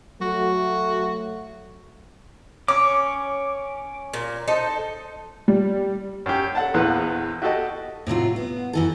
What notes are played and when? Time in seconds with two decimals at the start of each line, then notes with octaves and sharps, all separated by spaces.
0.21 F#3 A3 F#4
2.68 C#4 D6
4.14 A#2
4.48 D#4 A4 C5
5.48 G3
6.26 F#2 G4
6.55 A4 F#5 A5
6.74 A#1 E2 E3 B4 F#6
7.42 F#4 G4 A4 D#5
8.07 A2 C3 F#3 F4
8.36 B3
8.73 F#2 E3 A4